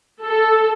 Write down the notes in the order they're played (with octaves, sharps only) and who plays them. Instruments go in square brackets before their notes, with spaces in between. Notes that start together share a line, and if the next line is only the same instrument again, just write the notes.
[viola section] A4